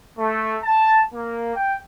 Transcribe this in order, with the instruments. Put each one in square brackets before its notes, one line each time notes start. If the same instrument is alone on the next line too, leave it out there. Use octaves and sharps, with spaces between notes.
[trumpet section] A3
A5
A#3
G5